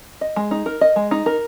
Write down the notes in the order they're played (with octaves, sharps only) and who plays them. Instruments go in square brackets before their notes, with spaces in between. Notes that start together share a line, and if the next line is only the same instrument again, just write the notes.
[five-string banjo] D#5
G#3
D#4
A#4
D#5
G#3
D#4
A#4